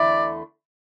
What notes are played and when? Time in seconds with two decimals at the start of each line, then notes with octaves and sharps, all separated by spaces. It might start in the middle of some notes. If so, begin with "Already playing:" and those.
Already playing: E2 D3 A3 E4 D5